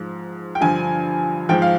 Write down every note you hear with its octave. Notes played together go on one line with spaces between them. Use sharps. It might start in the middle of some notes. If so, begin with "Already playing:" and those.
Already playing: G#2 F3
G5
G2 D3 F3 G#5
G#2 F3 G5
F5